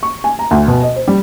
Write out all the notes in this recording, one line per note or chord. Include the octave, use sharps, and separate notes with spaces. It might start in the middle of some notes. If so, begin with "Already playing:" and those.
C#6
G#5
A#5
D2
B2
D#5
C5
G3